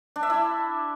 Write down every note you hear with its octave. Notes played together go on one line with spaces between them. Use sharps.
D4
E5
E4